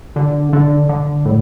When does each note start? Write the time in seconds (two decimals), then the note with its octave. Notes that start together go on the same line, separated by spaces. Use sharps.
0.16 D3
0.53 D3
0.89 D3
1.25 A2